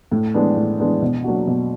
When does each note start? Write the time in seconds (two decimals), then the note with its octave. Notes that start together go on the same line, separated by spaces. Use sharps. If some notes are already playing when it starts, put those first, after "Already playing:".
0.12 A2
0.34 E3 G#3 B3 D4
0.56 A2
0.79 E3 G#3 B3 D4
1.02 B2
1.24 F#3 A#3 D4 F#4
1.47 B2